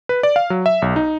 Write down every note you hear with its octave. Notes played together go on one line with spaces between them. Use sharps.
B4
D5
F5
F#3
E5
B1
D#4